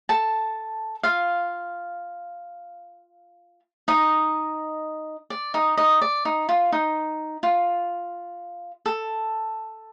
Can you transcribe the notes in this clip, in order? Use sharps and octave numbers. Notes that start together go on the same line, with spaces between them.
A4 A5
F4 F5
D#4 D#5
D5
D#4 D#5
D#4 D#5
D5
D#4
F4
D#4
F4
A4